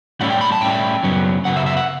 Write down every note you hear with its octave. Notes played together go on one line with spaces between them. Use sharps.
A2 G3 C#4 E4 F#5
G5
B5
A5
A2 G3 C#4 E4 G5
F#2 C#3 F#3 B3
F#2 C#3 F#3 B3 F#5
E5
E5
F#5